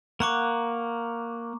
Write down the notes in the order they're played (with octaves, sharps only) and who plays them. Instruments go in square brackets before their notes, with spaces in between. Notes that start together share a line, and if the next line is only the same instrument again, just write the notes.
[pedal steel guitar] A#3 F#5 [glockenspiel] A#5 C#6 D6